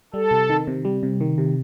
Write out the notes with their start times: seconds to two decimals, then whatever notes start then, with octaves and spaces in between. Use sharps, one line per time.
0.14 G3 A4
0.31 C3
0.49 D#3
0.67 C3
0.85 G3
1.03 C3
1.21 D#3
1.38 C3